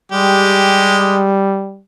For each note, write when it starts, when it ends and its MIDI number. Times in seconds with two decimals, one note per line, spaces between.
0.12 1.82 55
0.12 1.37 56
0.12 1.37 67